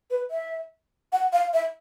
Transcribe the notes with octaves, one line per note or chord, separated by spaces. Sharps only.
B4
E5
F#5
F5
E5